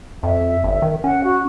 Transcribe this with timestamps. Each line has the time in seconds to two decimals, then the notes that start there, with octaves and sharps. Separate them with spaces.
0.23 F2 E5
0.64 G1
0.82 D#3
1.04 C#4 F#5
1.23 F#4